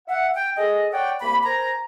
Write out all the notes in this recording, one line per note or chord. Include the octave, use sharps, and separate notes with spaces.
E5 F#5
G5
G#4 A4 D#5
C#5 D5 F#5 G5
C2 A#3 B5
A#4 C5 G#5 A#5